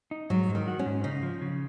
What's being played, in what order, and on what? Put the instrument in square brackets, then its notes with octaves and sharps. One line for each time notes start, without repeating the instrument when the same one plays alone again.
[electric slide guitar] D#4
[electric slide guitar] G#2 [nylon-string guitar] F#3
[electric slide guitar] G#2
[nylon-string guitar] D#3
[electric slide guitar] F#4
[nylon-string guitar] C#4
[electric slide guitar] G#2
[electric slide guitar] C#3 [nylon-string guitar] D#4
[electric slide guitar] F3
C#3